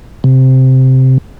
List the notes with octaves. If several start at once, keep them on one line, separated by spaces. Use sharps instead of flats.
C3